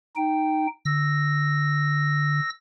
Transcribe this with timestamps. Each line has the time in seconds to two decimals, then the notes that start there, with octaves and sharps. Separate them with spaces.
0.16 D#4 G5
0.85 D3 E6 A#6